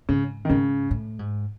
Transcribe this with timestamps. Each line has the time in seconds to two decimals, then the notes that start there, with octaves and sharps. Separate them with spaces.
0.09 G#2 C#3
0.45 D#3
0.49 G#2 C#3
0.91 A2
1.19 G#2